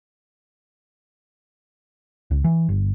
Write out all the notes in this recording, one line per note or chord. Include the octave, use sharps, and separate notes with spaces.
C#2
E3
G1